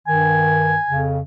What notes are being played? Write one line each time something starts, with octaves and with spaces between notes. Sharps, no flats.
G2 D#3 G#5
F2 C#3